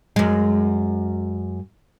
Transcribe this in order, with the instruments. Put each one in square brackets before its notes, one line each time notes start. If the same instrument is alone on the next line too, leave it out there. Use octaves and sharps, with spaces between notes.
[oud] F#2 G#3